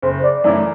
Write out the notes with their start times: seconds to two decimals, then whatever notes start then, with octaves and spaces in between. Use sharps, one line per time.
0.02 F#1 C5
0.23 D5
0.44 F#2 E3 A3 E4 D5